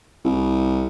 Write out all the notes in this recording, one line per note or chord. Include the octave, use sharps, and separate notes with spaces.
C2